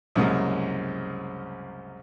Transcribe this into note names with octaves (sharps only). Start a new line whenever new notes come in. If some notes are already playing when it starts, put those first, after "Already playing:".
C2 F#2 C#3 G#3 A#3 D#6